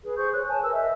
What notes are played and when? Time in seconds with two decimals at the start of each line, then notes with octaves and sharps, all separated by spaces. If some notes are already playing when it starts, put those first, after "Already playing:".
0.04 G#4 B4
0.17 G#4 C5 C#6 G6
0.33 C#5 F#6
0.48 C#5 G#5 A5
0.62 A#4 B4 E6
0.74 D#5 E5